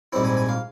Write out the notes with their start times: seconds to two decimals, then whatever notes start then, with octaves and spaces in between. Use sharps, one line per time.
0.13 A#1 G#2 G3 C4 E4
0.25 G#5
0.37 G#5
0.49 F5